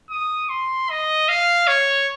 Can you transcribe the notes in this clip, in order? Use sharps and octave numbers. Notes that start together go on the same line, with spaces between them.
D#6
C6
D#5
F5
C#5